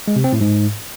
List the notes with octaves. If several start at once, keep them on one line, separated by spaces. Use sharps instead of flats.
G#3
C3
C4
A2
G#2